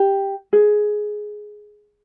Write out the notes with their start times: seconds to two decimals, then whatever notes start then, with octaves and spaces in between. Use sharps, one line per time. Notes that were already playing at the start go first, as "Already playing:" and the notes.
Already playing: G4
0.53 G#4